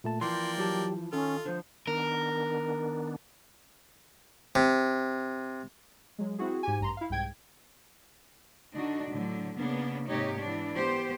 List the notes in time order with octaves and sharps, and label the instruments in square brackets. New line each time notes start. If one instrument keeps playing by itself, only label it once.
[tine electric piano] A#2 A3 A5
[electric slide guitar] E3 F3 [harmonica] A#3 D5 G5 [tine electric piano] C6
[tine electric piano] F#3 G4 A5
[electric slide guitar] D#3 [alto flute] C#4 [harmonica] F4 [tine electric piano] A4
[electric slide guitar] D3 F3 [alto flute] C5
[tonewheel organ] D#3 B3 D4 [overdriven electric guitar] A#4
[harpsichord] C3
[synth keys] F#3 G#3
C4 E4 F#4 G#4
G#2 G4 G#5
A1 G2 A#5 C6
E4 F5
C2 G#2 G5 G#6
[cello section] D3 D4 D#4 F#4
A2 D3 F#3
C#3 A#3 B3 D4
G#2 C3 A#3 D#4 G4 C#5
E3 B3 D4
B3 G4 C5